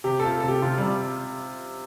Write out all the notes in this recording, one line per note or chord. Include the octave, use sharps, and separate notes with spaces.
C3 G4
F4 A4
A4
C3 G4
C3 F4
C3 G3